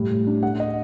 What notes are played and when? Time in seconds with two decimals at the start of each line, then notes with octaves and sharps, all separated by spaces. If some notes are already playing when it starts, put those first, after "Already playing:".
Already playing: A2 G3
0.10 A2
0.27 D4
0.43 A3 F#5
0.60 D#5